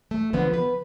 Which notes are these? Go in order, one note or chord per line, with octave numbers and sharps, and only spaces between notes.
A3
D3 F3 B3 D4
B4